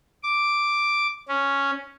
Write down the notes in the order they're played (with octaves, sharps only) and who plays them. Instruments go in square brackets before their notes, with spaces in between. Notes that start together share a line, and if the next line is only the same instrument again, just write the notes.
[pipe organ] D6
C#4